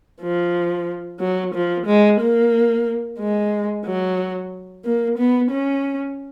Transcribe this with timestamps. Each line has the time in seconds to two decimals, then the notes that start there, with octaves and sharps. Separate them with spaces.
0.21 F3
1.20 F#3
1.54 F3
1.86 G#3
2.20 A#3
3.20 G#3
3.85 F#3
4.85 A#3
5.18 B3
5.51 C#4